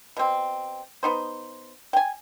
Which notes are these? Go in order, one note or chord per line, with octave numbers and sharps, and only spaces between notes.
B2 C4
B3 D#4 C5
G5 G#5